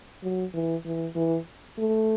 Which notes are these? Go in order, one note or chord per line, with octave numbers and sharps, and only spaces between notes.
F#3
E3
E3
E3
A3